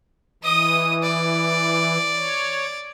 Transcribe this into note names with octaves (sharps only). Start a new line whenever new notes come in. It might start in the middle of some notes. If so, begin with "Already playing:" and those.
E3 D#5 D#6
D5
C#5